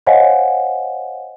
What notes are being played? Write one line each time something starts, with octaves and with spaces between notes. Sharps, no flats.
C5 C#5 D#5 F5 F#5 G#5